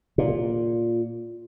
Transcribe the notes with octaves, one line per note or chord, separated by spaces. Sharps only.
A#2